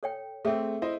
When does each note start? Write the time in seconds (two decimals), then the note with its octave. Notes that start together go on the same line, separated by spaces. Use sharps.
0.03 A4 C#5 G5
0.45 A3 C4 G#4 A4 E5
0.82 E4 C5 D#5